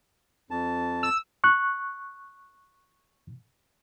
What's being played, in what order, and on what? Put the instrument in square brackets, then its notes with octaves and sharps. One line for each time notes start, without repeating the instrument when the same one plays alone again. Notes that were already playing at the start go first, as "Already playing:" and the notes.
[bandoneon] F2 A5
[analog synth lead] E6
[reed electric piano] C#6 F#6